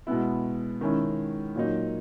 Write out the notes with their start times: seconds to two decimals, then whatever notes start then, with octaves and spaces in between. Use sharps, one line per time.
0.07 B2 G#3 B3 E4
0.81 D#3 G#3 C#4 E4
1.56 A#2 F#3 A#3 D#4